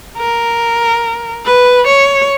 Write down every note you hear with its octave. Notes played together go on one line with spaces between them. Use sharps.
A#4
B4
C#5